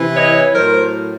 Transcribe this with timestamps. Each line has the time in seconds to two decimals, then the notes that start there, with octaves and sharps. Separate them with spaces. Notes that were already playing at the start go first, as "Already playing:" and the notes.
Already playing: C3 E3
0.16 C#5 D#5
0.55 A2 F#3 A#4 C5